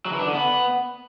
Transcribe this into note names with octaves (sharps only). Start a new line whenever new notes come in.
F#3
E3
D4
D3
B3